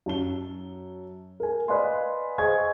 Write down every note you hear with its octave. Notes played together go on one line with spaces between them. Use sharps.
F#2 A5 G7
A#4 G#5
B4 D5 D#5 F5 G#5 C6
G#4 C5 D#5 G#5 C#6 G#6